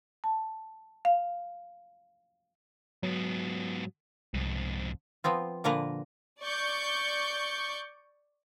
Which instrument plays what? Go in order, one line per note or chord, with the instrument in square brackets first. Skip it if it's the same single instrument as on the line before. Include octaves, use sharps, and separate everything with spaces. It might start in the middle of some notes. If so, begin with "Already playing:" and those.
[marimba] A5
F5
[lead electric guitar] G#2 B3 [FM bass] F#3
[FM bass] C2 [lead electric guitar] F2 G#2
[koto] F3 B3 C4 F4
A#2 D3 F3 A#3 A#4 B4
[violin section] D5 C#6 G6